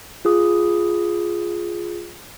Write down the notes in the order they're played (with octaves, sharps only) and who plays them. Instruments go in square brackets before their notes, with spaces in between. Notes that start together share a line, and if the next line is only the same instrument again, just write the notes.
[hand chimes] F4 G#4 D#6